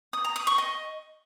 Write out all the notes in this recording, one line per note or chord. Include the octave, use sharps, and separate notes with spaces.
D#6
A#5
D#6
C#6
D#5